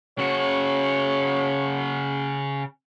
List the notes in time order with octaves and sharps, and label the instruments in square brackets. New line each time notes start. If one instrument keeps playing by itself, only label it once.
[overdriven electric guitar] C#3 F#4 [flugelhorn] C#5